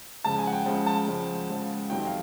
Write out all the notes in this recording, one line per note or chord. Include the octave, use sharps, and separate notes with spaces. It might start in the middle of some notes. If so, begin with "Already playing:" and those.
C#2 C#3 F3 A5
G#5
F#5
G5
C#2 C#3 F3
A5
C#2 C#3 F3
C#2 C#3 F3
F2 C3 D#3 F#3 G5
F5